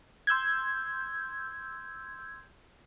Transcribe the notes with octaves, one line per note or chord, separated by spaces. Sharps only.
C6 E6 G6 G#6